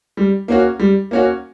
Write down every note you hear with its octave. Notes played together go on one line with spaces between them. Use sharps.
G3
A#3 C#4 F#4
G3
A#3 C#4 F#4